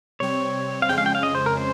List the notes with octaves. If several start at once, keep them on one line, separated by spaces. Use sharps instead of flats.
C3 G3 C4 C#5
F5
F2 C#3 G#3 C#4 G5
F5
G5
F5
D#5
C5
A#4
C5